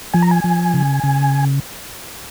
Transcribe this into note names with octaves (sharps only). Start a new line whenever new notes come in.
F3 G#5
A#5
G#5
F3
C#3
C#3